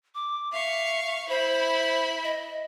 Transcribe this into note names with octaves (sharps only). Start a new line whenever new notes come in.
D6
E5 F5 C#6
E4 C5 B5
D#5